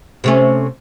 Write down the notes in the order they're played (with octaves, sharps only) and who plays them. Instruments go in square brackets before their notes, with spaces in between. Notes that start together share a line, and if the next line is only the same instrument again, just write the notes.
[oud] C3 A3 C#4